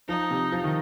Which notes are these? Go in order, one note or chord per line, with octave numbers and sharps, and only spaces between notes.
F3 D#4
C3
F3
D#3